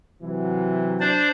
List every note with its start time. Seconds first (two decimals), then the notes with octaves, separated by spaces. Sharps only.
0.22 C3 E3 F#3
1.00 D4 C5 D5